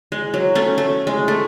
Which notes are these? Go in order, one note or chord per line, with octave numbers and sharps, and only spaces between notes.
G#3
F#3
A3 C#4
A3
G#3
A3